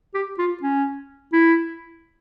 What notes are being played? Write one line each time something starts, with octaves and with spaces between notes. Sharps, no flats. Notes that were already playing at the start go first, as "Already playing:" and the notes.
G4
F4
C#4
E4